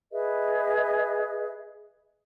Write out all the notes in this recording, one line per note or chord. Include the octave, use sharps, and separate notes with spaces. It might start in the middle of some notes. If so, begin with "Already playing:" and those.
G#4 B4 D#5 E5